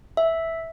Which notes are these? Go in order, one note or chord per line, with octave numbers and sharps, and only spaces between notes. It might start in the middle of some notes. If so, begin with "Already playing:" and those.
E5